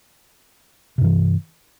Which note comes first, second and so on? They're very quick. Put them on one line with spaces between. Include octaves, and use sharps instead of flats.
C3 G2 E3